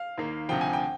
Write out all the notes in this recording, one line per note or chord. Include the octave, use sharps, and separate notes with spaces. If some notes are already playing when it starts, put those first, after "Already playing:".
Already playing: F5
D#2 D#3 A#3
D2 C3 F3 G5
G#5
G5